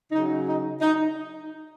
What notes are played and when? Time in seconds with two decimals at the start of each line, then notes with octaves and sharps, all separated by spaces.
0.12 C#3 F#3 D#4
0.46 D#4
0.81 D#4